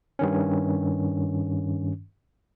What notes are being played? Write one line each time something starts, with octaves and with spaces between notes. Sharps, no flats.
G2 D#3 C#4